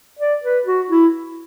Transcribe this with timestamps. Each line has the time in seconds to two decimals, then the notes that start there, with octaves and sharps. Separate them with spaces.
0.19 D5
0.43 B4
0.66 F#4
0.90 E4